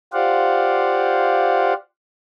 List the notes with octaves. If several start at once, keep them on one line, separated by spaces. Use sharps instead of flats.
F4 G4 C5 D5 F5 F#5